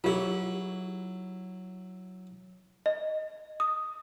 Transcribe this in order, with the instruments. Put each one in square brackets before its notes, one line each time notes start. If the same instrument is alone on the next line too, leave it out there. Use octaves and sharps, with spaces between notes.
[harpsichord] F#3 E4 [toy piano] F4 G4 G#4
[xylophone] D#5
D#6